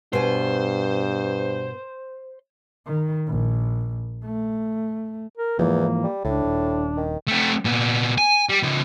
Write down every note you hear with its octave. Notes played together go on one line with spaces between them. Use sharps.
G2 B2 C5 G#5
D#3
A#1
A3
A#4
E2 G#2 E3 F3 A#3
G3
C#2 A2 D4
D#1
D#3
A3 C4
A#2 B3
G#5
G3
C#3 B3